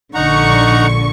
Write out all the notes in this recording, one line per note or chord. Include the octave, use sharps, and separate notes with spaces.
A#1 D3 D#4 F#5 A#5 C#6